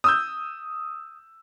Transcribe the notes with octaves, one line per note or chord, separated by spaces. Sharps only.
D#6 E6 G6